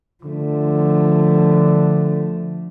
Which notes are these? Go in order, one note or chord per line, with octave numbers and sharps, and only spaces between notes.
D3 F3 A3